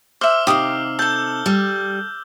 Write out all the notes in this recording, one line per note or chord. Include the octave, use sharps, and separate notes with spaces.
C5 E5 D6 E6 F6
C3 D#3 G4 F5 D#6
A4 A5 E6 G6 G7
G3